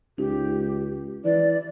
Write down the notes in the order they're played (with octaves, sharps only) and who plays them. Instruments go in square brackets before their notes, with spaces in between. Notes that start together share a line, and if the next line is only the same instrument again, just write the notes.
[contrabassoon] C#2 [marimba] D#4 [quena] G4
[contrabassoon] E3 [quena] D5